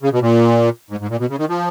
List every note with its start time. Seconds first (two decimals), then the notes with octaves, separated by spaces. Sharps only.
0.02 C#3
0.13 B2
0.22 A#2
0.90 G#2
1.00 G#2
1.10 A#2
1.19 B2
1.29 C#3
1.39 D#3
1.49 F3